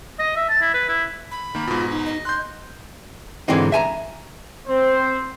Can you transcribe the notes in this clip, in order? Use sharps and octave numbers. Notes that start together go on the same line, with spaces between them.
D#5
E5
A5
E4
B4
E4
B5
D#3 A#3
G#2 B2 F4
D#4
D#5
C6 F#6 G6
G#2 D3 E3 G#3 C4 D#4
E5 G#5 A#5
C4 C5